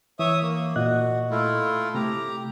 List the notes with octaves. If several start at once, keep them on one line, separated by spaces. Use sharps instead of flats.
E3 C#5 E5 D#6
A#3
A#2 F#4 D#5 F#6
A3 E4 F4
C3 A3 G4 A#5